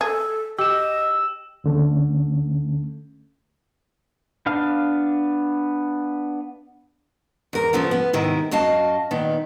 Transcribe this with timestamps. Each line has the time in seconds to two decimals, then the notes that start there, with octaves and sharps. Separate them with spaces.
0.01 G#4 A4
0.58 G4 D#5 E6 E7
1.64 D2 D3 A3 C#4
4.46 B3 D4 F5 F6
7.53 E2 A#4
7.73 C#3 F3 A3 B3
7.91 B3
8.13 G#2 C3 D#3 E4
8.51 F#2 F#4 D#5 F5 A5
9.11 A#2 D#3 B3